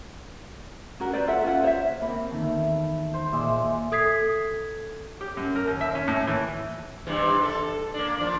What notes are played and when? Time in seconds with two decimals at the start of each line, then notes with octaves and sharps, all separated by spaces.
1.00 C#4 F#4 A#4
1.13 B4 C5 D5
1.26 F4 A4 E5 F#5
1.44 C#4 F4 F#5
1.63 C5 C#5 D#5 E5
2.02 A#3 C4 B5
2.31 E2 D#3 A3
3.14 C5
3.32 A#2 G#3 D5 E5
3.92 A4 D#6 G#6 B6 C7
5.21 G4
5.37 F#2
5.56 A#4
5.67 D#2
5.81 E5
5.95 C#4
6.08 A2
6.27 E3
7.07 G2 C3 E3
7.43 A4
7.94 A#3 D4
8.20 F3 D4